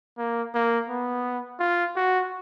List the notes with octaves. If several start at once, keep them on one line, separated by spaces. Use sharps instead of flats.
A#3
A#3
B3
F4
F#4